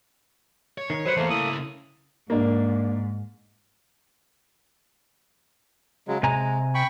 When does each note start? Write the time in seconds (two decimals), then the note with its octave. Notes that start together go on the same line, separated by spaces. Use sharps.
0.78 C#5
0.90 D#3
1.06 F#3 B4 C5 F#5
1.17 E2 A3 A#3
1.30 C#3 E4 D#6
2.30 G#2 A#3 D4
6.08 C#3 F#3 G#3
6.23 C3 G#3 G#5 A#5
6.75 G5 B5 C#6